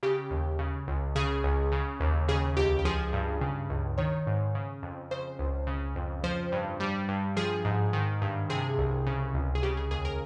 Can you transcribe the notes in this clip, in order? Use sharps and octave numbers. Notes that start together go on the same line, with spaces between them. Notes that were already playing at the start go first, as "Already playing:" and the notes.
C#3 G4
D#2
C#3
C#2
C#3 G#4
C#2
C#3
D#2
C#3 G#4
C#2 G4
G4
F3 G#4
G2
C#3
C#2
D#3 C#5
G#2
C#3
F2
C#3 C5
C#2
C#3
F2
F3 C5
G2
G3
G2
F3 G#4
G#2
D#3
G2
C3 G#4
C2
C#3
C#2
G#4
C#3 G4
G#4
D#2 G#4
A#4